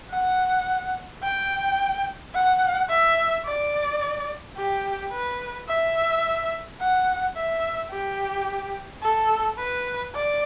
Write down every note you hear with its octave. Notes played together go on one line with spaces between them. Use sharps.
F#5
G5
F#5
E5
D5
G4
B4
E5
F#5
E5
G4
A4
B4
D5